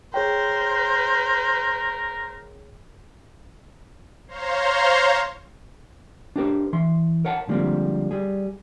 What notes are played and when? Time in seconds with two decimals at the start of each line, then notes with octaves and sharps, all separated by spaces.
0.14 G#4 A#4 C5 C#5 G5
4.28 C5 C#5 F5 A#5 C6
6.36 D4 G4 A#4 C5
6.73 E3 C6
7.25 A#4 C#5 F#5 G5 A5
7.49 D3 F3 G3 G#3 A#3 C4
8.11 G3 G#4